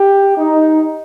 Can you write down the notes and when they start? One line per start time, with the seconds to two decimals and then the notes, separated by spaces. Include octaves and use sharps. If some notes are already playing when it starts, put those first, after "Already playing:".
Already playing: G4
0.38 D#4